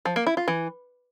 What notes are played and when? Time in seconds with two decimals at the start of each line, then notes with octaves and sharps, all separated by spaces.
0.05 F3
0.16 A#3
0.27 E4
0.37 F4
0.48 E3